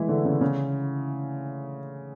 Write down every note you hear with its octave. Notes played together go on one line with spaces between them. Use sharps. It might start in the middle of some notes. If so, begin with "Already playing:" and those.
Already playing: E3 G#3 A3 E4
D3
C#3
C#3